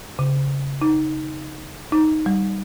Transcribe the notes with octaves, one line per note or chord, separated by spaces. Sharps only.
C#3
D#4
D#4
G3